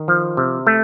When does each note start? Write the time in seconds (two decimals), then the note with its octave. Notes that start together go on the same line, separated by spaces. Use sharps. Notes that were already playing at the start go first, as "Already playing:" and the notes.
Already playing: D#3
0.08 F3
0.37 C3
0.67 A3